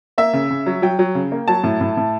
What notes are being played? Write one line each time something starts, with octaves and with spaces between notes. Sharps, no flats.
A#3 E5
C#3
C#3
F#3
F#3 G5
F#3
C#3
A#3
F#3 A5
A2
A2
A2